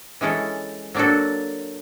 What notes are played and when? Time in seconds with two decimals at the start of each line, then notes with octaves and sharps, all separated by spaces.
0.21 E3 G#3 C#4 E4 A4
0.94 F#3 A#3 D4 F#4 A4